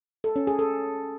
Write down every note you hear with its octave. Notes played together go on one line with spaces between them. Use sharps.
A4
C#4
G#4
A4